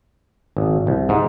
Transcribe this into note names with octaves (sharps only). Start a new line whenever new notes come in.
G#1
C2
G#2